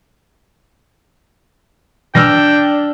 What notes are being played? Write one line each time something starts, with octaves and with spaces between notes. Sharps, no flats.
B2 E3 G3 D4 G5 E6 F6 A#6